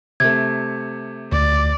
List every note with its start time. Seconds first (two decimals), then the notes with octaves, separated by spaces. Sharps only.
0.20 C3 A3 G#6
1.32 D2 D5